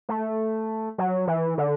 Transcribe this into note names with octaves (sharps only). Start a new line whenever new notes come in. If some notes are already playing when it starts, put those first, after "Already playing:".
A3
F#3
E3
D3